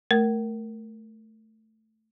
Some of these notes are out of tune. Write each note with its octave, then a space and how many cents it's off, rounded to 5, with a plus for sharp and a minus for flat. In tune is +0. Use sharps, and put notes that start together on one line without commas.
A3 +0 A#4 +0